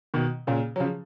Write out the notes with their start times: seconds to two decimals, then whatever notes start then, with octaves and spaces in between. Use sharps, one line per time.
0.14 B2 D#3
0.47 A#2 C#3
0.76 F#3
0.80 C#3 F3